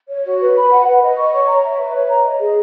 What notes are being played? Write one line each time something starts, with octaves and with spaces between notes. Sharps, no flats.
C#5
F#4
B4
B5
F#5
B4
D#5
C#6
C#5
A#5
E5
B4
C#5
A#5
D#5
G#4